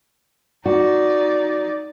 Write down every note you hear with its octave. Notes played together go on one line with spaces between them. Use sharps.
D#4 F#4 D5